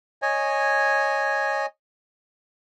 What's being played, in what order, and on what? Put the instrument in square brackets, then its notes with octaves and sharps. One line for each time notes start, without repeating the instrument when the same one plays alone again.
[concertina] C#5 D#5 G#5